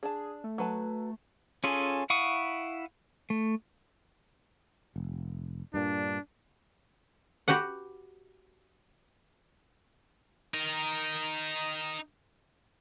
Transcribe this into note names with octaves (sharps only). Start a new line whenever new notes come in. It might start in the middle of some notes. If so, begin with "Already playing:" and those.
D4 G#4 A5
A3
F#3 B4 A5
C#4 F4 G#4 A4
E4 F5 F#5 C#6 D#6
A3
F1
G2 A#2 D4
F#4 G4 B4 F#5
D#4 A#4